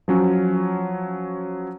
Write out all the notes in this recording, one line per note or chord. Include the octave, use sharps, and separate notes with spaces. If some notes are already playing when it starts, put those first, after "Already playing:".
F3 F#3 C#4